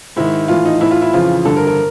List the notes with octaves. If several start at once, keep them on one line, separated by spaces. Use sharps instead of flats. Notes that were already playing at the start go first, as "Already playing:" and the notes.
G#2 D#3 E4
A2 E3 F4
D#4
A2 E3 E4
F4
E4
F2 C#3 E3 F4
G2 D3 A4
A#4
A#4